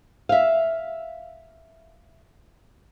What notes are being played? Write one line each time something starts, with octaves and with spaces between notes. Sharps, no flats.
E5 F5